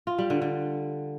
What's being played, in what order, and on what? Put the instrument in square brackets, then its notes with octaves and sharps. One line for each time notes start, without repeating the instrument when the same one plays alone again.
[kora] F4
G3
D3
D3